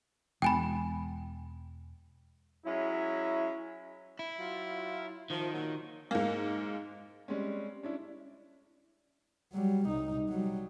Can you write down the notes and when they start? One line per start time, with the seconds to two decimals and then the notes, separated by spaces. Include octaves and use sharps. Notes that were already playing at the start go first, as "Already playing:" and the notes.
0.42 E1 G5 G#5 B5
2.65 F#3 G#3 C#4 E4
4.19 E4
4.39 F#3 F4
5.30 D#3 F3
5.52 A#2 F3 F#3
6.11 G#2 A#3
7.28 G3 G#3 C4 C#4
7.83 C#4 D4 E4
9.53 F#3 G3
9.87 C2 D#4
10.29 F#3 G3